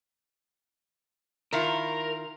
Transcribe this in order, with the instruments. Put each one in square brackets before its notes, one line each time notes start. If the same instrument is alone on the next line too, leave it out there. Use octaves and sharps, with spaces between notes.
[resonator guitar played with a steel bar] D#3 E4 F4 [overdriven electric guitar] A#4